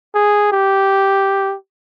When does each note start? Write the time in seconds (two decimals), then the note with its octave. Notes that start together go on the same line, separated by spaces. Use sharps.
0.15 G#4
0.52 G4